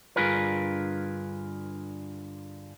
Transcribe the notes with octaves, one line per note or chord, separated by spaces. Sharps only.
G2 D3 F4 G#4 A#4 B4